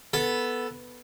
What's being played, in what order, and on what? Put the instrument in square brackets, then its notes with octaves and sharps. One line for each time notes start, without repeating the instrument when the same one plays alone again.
[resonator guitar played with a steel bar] B3 [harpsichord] A4